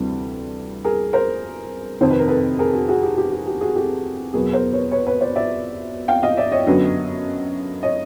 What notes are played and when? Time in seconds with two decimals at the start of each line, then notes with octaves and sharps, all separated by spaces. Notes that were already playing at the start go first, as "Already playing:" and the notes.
Already playing: D2 C3 E3 G3 C4
0.84 G#4 A#4
1.13 A#4 C5
2.01 F2 C3 D#3 C5
2.10 B4
2.19 A#4
2.28 A4 B4
2.59 G#4 A#4
2.73 F#4 G#4
2.88 F#4 G#4
3.03 G4
3.18 G4
3.32 G4
3.47 G4
3.61 F#4 G#4
3.76 G4 A4
4.34 E2 B2 F#3 B3 G#4 A#4
4.53 A#4 C5
4.72 B4 C#5
4.91 B4 C#5
5.06 B4 C#5
5.21 C5 D5
5.36 D5 E5
6.08 F5 G5
6.23 D#5 F5
6.37 D5 E5
6.52 C#5 D#5
6.67 F#2 D3 F#3 B3
7.83 C#5 D#5